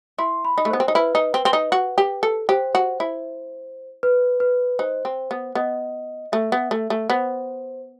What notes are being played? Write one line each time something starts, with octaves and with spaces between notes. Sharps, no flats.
E4 C6
B5
D#4
A3
B3 C5
C4
D#4
E4 B4
D#4
C4
C4
D#4
F#4
G4
A4
G4 C5
F#4
E4
B4
B4
D#4 C5
C4
B3
B3 D#5
A3 E5
B3
A3
A3
B3 C5